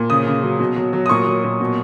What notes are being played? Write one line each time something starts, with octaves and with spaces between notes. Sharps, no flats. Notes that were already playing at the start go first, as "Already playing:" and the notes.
Already playing: A#2
C#3 D#6
C#3
F#3
B2
F#3
F#3
D#6
A#2 C#6
F#3
A#2
B2